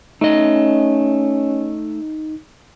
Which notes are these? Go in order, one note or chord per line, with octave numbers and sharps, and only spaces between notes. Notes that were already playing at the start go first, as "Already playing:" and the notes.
A3 C#4 D#4 D#5